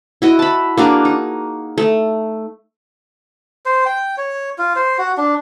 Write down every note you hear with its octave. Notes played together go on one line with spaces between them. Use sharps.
E4 F#4 D#5
A5 B5
A#3 D4 F#4 G#4
D#4
A3
C5
G5
C#5
F4
C5
F#4
D4